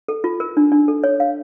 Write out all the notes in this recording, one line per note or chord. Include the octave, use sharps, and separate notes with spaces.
A4
F4
A#4
D4
D4
A4
C#5
F5